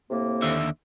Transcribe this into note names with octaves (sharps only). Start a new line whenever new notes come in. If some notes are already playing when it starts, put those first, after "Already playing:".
A2 C3 A#3
D#2 D3 E5